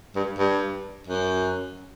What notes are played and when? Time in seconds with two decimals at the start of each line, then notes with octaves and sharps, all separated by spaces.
0.15 G2
0.38 G2
1.07 F#2